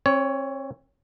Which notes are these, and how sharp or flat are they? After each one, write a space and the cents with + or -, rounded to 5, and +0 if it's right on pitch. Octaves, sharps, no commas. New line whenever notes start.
C4 +40 C#5 +15